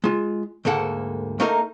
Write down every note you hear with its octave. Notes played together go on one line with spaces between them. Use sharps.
G#3 F4
D2 G#2 A#3 A4 F#5
A3 A#3 D#4 A4 A#4